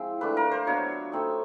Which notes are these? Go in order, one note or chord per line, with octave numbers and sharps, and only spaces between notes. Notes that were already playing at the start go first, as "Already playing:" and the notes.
Already playing: F3 G#3 C4 E4
A3 D4 F4 B4
A#4
C5
F#3 B3 D4 F4 C#5
A3 C4 D#4